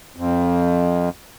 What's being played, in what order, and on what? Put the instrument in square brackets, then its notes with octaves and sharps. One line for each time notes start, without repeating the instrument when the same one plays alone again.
[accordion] F2